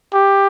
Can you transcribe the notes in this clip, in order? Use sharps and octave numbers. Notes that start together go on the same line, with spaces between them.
G4